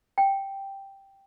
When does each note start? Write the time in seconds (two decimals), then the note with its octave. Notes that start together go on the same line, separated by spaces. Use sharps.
0.18 G5